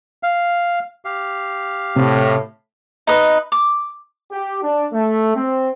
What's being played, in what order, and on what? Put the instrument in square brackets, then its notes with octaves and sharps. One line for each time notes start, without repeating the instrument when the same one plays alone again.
[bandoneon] F5
[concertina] G4 F5
[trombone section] A2 [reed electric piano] C3
[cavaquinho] D#4 B4 D#5
D6
[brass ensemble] G4
D4
A3
C4